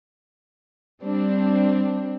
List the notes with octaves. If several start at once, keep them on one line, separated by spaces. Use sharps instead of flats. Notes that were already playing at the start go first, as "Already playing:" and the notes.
G3 C4 D4